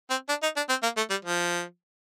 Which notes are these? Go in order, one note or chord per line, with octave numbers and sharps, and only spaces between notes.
C4
D4
D#4
D4
C4
A#3
A3
G3
F3